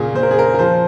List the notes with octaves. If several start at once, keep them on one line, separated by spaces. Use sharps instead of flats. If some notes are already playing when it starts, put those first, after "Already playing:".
Already playing: A#2 C#3 G#4
A#2 C5
A#4
G#4
A#4
A#4
F3 C5